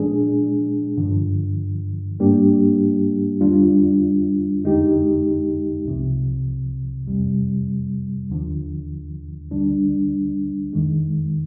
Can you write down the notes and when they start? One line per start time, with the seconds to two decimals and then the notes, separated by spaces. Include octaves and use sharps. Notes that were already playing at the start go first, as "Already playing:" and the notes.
Already playing: A#2 F3 G#3 D4 G#4
0.97 G2 D3 F3
2.19 G#2 G3 A#3 D4 G4
3.41 F2 D3 G3 D4 F4
4.63 F2 D3 G#3 D#4 G4
5.85 C2 C3 F3
7.07 F2 C3 G3
8.30 D#2 D3 F3
9.51 D2 D3 G3 D4
10.73 F2 D#3 G#3